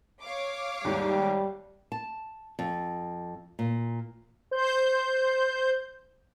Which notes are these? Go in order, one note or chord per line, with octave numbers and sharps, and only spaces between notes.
C#5 F5 D6
D#2 G#2 G3 G4
A5
F2
A#2
C5 G6